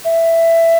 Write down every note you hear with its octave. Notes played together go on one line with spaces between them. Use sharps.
E5